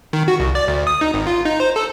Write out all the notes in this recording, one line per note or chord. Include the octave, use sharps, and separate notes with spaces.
D#3
F#4
C2
D5
D2
D#6
D#4
G#1
F4
D#4
C5
A4